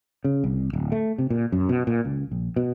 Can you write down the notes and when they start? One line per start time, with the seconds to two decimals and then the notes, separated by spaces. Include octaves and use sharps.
0.24 C#3
0.44 C2
0.73 D1
0.92 A3
1.18 C3
1.30 A#2
1.52 F#2
1.69 B2
1.87 A#2
2.05 C#2
2.32 A#1
2.56 B2